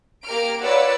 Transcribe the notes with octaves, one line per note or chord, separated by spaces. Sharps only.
A#3 G4 A#4 F6 D7
F4 B4 C#5 D5 F#5 E6